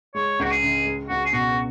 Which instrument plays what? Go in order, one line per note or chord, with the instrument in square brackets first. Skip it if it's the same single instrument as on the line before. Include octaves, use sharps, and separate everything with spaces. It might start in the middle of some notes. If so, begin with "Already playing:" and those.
[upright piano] G#3 [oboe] C#5
[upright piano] C#2 [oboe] F#4
[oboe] G#4
[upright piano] C#3
G#3
[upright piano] C#2 [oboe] F#4
[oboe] G#4
[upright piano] B2 [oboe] F#4